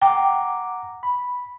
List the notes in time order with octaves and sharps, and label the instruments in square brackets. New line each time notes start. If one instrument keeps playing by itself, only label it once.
[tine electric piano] F#5 A#5 D6 [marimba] G5
[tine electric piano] B5